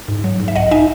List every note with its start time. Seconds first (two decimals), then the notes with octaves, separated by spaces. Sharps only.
0.08 G#2
0.24 F#3
0.40 G#2
0.48 E5
0.56 B1 D#5 F#5
0.71 D#4 E5 G#5